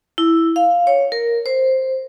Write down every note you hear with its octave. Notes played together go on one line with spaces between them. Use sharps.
E4
F5
C#5
A#4
C5